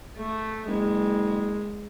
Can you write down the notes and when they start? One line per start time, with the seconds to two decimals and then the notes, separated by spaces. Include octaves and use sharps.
0.17 A3
0.67 F#1 G#3